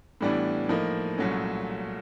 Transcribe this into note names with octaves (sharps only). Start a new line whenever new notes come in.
A2 E3 G3 B3 D4
A2 F3 A#3 D#4
C2 A#2 F#3 A3 C#4